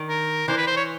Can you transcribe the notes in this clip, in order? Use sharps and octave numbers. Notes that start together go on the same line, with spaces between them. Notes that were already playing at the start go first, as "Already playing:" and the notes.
Already playing: D#3
A#4
E3 C5
B4
C5
C#5